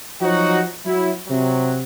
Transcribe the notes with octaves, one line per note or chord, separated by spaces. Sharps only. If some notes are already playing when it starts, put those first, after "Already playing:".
F3 F#3 D#4 F#4
F#3 E4
C3 F#3